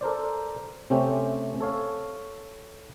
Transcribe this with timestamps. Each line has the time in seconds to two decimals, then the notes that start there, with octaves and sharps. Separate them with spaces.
0.01 A4 A#4 C5 D5
0.90 C3 A3 C4 C#4 G4
1.60 A4 C#5 F5